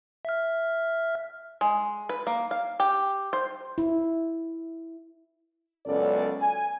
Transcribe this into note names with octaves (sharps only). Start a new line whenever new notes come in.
E5 F6
G#3
B4
A#3
F5
G4
C5
E4
C#2 F#2 B3 C#4 A4 D5
G#5